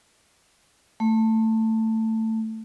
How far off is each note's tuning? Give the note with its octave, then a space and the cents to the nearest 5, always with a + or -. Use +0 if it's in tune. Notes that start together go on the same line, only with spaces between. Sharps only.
A3 +15